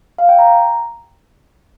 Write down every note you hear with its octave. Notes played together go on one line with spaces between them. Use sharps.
F5
G5
A#5